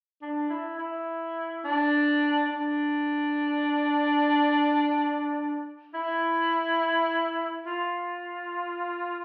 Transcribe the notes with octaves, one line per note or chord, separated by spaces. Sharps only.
D4
E4
E4
D4
D4
E4
F4